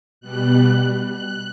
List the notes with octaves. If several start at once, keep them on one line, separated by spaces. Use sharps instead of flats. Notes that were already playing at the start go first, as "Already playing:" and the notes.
B2 G3 F#6
F#6